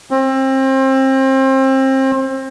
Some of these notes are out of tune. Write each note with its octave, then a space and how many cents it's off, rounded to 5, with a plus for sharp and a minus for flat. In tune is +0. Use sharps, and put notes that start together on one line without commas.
C4 +30